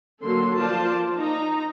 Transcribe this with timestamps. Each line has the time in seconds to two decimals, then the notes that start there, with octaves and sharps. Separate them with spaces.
0.24 D3 F#3 A#3 A4 C6
0.57 F3 A#3 F4 C5 D5 A5
1.16 D#4 A#5